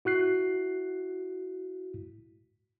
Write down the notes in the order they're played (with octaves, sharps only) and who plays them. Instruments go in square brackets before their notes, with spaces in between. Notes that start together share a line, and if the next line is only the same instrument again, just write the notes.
[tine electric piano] E4 F#4 F#6 C7